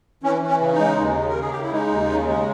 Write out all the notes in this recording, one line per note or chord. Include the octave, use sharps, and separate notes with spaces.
E3 C#4
E3
C#4
C#3
D#4
G#3
D#2
C#3
A#4
C#3 G#4
C#3 G4
E4
G#3 D#4
D#2
C#3
G#3